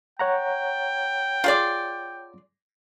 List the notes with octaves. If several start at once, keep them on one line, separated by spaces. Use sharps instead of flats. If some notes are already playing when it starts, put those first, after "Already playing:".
C#5 F#5 G5 A#5
F4 G#4 D5